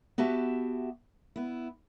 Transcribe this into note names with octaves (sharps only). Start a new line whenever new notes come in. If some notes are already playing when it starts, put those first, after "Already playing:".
B3 F#4 G4 E5 A5
B3 E4